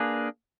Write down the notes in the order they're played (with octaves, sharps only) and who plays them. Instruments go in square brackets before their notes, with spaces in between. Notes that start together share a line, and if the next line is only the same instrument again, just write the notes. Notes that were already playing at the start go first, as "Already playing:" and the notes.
Already playing: [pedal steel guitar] A#3 D4 G#4 B4